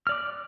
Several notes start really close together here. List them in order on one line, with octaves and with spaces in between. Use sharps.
F6 D5 D6 F#6